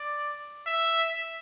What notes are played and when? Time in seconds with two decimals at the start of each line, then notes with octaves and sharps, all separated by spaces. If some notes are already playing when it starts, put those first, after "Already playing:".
Already playing: D5
0.67 E5